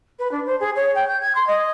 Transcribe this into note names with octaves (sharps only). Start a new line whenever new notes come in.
B4
D4
C5
G#4
C#5
G5
G6
G#6
C6
D#5